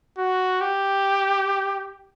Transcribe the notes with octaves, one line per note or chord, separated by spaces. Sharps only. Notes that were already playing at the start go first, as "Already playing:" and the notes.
F#4
G4